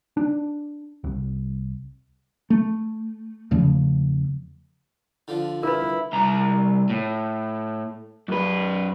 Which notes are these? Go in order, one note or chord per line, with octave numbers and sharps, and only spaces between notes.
D4
C2
A3
E2 C#3 F3 A3
D3 F3
E4 A#4 B4
C2 A#5
A2
F#2 B4